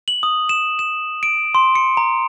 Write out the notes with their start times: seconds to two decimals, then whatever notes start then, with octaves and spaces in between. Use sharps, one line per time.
0.08 F#7
0.23 D#6
0.49 E7
0.79 E7
1.23 D7
1.55 C6
1.75 C#7
1.97 A#5